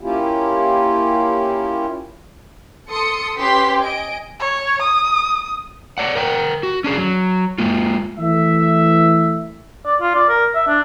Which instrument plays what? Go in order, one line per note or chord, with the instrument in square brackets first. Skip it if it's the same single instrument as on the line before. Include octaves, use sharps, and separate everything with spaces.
[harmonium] A#3 C#4 E4 F4 G4
[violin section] A4 C6 D#6 C#7
C#4 G4 B4 C6 B6
D#5 G#5 D7
[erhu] C#5
D#6
[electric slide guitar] C#5 D5 F#5
A#4 F#5 G5
F#4
C#4 D4 G#4
F#3
G#3 A#3 F4
[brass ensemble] E3 A3 E5
[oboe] D5
F4
D5
A#4
E5
D4